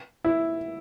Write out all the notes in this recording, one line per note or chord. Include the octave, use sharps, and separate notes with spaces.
E4